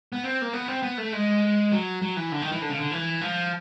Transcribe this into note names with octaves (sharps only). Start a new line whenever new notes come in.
B3
C4
A#3
B3
C4
B3
A3
G#3
F#3
F#3
E3
D3
D#3
E3
D3
C#3
D3
E3
F3